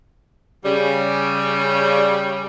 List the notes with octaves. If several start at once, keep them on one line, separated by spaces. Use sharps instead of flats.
C#3 G3